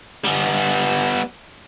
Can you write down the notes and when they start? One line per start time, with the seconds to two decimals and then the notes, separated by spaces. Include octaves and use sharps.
0.25 G3 B3